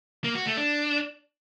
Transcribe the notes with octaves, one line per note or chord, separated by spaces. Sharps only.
A#3
F#4
A3
D4